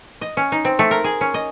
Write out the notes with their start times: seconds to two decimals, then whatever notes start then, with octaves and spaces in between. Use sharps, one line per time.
0.21 D#5
0.37 C#4
0.52 D#4
0.65 C4
0.79 A3
0.91 A#4
1.04 G#4
1.21 C#4
1.34 D#5